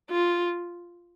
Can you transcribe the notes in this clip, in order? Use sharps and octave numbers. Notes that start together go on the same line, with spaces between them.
F4